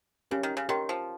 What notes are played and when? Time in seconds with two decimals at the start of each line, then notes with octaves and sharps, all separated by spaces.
0.31 C#3 C#4 G4 A#4
0.43 D#3
0.57 C#3
0.69 D#3 G4 A#4 C#5 G5 C6
0.89 F3